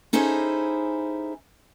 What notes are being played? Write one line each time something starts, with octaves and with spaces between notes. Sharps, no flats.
C#4 D#4 E4 G#4 A4 C5